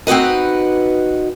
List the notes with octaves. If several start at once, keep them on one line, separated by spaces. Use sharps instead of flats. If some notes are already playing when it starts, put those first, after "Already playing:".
C4 D#4 F#4 B4 D#5